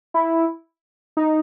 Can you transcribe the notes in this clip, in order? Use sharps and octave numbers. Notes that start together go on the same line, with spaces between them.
E4
D#4